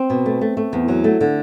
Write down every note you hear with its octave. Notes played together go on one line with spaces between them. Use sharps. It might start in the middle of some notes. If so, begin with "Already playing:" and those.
Already playing: C4
B2
A3
A3
A3
E2
F#3
A3
D3